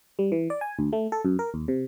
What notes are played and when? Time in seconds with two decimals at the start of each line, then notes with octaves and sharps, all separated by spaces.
0.19 G3
0.32 E3
0.50 D5
0.61 G#5
0.79 D2
0.93 A3
1.12 A4
1.25 F#2
1.39 A#4
1.54 D#2
1.68 C3